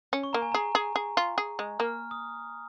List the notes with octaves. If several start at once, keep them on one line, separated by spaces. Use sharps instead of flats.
C#4
C#6
A#3 A#5
G#5
G#4 A#5
G#4
G#4
F4
G#4
G#3
A#3 F6
D#6